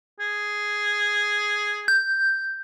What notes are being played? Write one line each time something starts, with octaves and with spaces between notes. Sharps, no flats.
G#4
G6